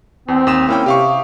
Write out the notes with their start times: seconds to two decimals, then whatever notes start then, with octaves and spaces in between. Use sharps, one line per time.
0.28 E2 C4
0.47 D#2 D#6 E7
0.68 A#3 C#4 E4 G5
0.86 C3 G4 F5 C#6